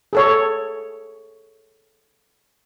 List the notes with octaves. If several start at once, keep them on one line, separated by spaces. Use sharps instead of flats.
G#4 A4 C#5